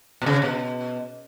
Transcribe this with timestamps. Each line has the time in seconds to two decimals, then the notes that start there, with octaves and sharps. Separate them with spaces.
0.22 B2
0.26 C#3
0.42 B2